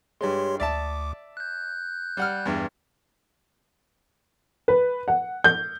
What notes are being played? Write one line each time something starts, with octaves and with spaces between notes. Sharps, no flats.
G2 G#3 G4 C#5 C6
D2 D5 E5 A5 D6
F#6 G6
G3 F#5 F6
E2 G2
B4
F#5
G6